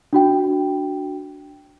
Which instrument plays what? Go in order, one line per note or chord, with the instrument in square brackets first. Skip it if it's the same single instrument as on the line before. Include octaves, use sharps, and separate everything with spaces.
[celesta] D4 F#4 G5